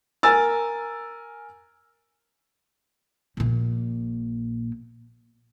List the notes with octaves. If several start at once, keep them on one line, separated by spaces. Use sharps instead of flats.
A#4 G#5 E6 A6
A#1 A#2